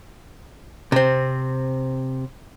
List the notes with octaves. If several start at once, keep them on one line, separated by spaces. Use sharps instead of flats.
C3 C4